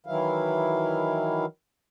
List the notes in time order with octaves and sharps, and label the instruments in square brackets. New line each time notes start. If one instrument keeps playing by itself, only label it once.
[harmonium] D#3 E3 F#3 E4 F5